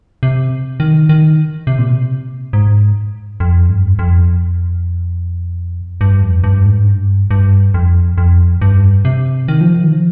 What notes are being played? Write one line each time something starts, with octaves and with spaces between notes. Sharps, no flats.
C3
D#3
D#3
C3
A#2
C3
G#2
F2
G2
F2
G2
F2
G2
G#2
G2
G2
F2
F2
G2
C3
D#3
F3
D#3
F3